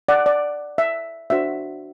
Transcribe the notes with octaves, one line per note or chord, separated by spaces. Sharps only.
D5 F#5
D5
E5
D4 F#4 C5 E5